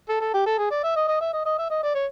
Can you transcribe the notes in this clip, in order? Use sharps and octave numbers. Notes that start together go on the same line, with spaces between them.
A4
A4
G4
A4
G#4
D5
E5
D#5
D#5
E5
D#5
D#5
E5
D#5
D5
C#5